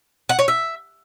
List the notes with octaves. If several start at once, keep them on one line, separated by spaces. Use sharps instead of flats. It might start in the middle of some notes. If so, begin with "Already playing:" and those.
F#5
C#5
E5